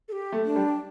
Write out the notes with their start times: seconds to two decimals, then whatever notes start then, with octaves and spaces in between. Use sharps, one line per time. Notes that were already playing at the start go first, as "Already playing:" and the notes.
0.08 A4
0.12 G4
0.32 A3
0.45 D4
0.56 G3